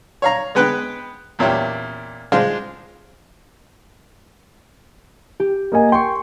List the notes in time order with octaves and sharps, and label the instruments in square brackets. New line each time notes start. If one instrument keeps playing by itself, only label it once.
[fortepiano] C#5 F5 A#5
G#3 B3 B4 G5 F#6
E2 A#2 C#4 E4 G4
G#3 D4 F4 C5 F5
[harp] G4
[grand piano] A#3 D#5 G#5
[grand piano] G5 [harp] C6 C#6